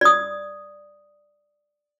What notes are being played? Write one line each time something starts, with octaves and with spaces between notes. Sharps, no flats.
D5 D#6